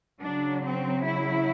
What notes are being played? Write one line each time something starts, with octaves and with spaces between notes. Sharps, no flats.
C#3 F#3 D4
C4
E4